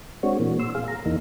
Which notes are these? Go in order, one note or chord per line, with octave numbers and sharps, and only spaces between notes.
G#3 C4 D4 F#4 C#5
A#2 E3 A#3
C6 E6
G#4 F5
A#5
E2 E3 A#3 D#4